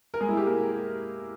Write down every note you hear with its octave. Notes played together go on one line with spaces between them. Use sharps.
A#4
G#3 G#4
E4
G4
A#3 A#4